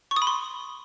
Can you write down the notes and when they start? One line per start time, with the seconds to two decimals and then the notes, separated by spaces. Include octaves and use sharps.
0.11 C#6
0.16 D#6
0.22 B5
0.27 C6